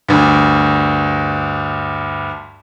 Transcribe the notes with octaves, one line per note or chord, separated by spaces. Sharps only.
D2 G2